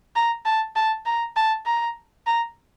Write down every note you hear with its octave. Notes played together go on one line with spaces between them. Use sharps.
A#5
A5
A5
A#5
A5
A#5
A#5